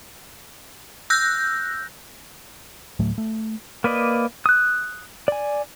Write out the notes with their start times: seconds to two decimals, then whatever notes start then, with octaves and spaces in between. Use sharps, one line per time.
1.10 E6 F#6 G6 A#6
2.99 D2 A2 F#3 A3
3.18 A3
3.84 A#3 B4 D5 D#5
4.46 D#6 F#6
5.28 D5 G#5